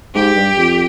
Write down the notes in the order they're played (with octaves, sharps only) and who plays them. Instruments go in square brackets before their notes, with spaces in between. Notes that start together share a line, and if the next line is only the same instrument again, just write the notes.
[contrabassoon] G#2 [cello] G4
[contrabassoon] G2
F2